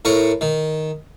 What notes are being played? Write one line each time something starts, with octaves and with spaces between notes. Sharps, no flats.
A2 A#4 C#6
D#3